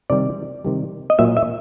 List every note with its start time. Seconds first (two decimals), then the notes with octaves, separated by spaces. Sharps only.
0.10 C3 D#3 G3 D5
0.65 C3 D#3 G3
1.10 D#5
1.19 A#2 F#3 A#3 E5
1.37 E5